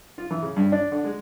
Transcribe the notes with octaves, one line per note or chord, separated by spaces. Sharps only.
F4
E3
C#3
G2
D4
D3
G#3